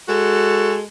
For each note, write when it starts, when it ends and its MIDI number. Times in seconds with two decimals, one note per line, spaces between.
0.07 0.81 56
0.07 0.81 66
0.07 0.81 69